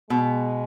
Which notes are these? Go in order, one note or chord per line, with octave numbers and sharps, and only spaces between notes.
B2 G#3